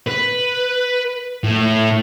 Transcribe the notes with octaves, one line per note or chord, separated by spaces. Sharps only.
B4
A2